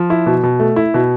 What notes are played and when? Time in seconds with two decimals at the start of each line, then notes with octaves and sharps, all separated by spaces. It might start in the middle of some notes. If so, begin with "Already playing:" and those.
Already playing: F3
0.10 E4
0.26 B2
0.43 B2
0.60 A3
0.76 E4
0.94 B2